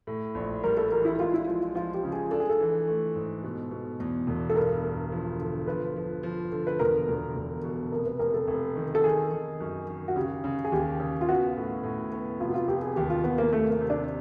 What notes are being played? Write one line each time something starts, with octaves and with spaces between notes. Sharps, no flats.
A2
A#1
G3 A#4
A4
E3 A#4
E4
G#3 F4
E4
F3 F4
F4
F3 F4
G4
C#3
G#4
D4 A4
G#4
A4
E3
A3
G#2
B2
B2
E2
E1
A4
G2 A#4
G2
F3
D3
F3 B4
F3
F3
D3
B4
E1 A#4
E1
E1
B2
F1 A#4
B4
F1 A#4
A4
F1
D#3
A4
D#3 G#4
D#3
F#2
D#3
F#4
C#3 G4
C#3
G#4
D#2 G4
C#3
F4
B3 F#4
A2
A2
B3
F1 F4
F#4
F4
F1 G4
G#4
D#2 G4
F4
D#2 B3
A#3
C3 A3
A#3
C3
D4